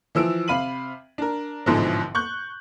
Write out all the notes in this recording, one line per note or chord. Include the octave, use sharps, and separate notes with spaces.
E3 F3 E6 D7
C3 F5 B5 D#7 F#7
D4 A#4
A1 G#2 B2 D3 E3 F3
C#6 F#6 G6